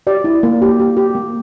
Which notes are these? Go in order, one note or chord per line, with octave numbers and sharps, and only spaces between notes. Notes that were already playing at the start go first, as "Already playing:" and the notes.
G4 D5
E4
A#3
G4
G4
G4
A#3